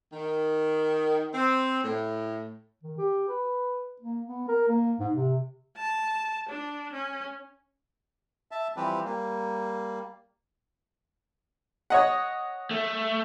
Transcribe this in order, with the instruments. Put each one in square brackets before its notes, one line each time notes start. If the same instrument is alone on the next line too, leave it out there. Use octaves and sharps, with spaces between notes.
[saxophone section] D#3
C4
A2
[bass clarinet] D#3
G4
B4
A#3
B3
A#4
A#3
G#2
C3
[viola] A5
D4
C#4
[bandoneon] E5 A5
E3 F3 G3 C4 G4 B4
G3 A#3
[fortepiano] C#5 D#5 F#5
[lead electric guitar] A3